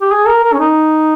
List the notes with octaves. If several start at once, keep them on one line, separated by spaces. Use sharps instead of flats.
G4
G#4
A#4
A#4
C#4
D#4